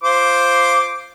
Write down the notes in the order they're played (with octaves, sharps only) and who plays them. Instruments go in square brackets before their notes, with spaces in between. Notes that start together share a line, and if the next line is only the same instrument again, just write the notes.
[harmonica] F4 C5 D6